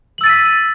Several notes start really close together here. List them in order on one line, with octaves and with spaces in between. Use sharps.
F#7 E6 A6 D#7 B6